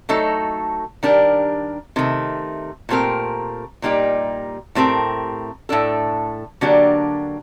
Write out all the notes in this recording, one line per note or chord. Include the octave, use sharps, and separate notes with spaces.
F#3 A3 D#4 A4
D#3 G3 D4 G4 A#4
C3 D#3 A3
A#2 A3 C4 G4 A#4
A#2 G3 A#3 D#4 G4
A2 A3 C4 G4 A#4
A2 A3 D4 A4
D3 F#3 A#3 D4 G4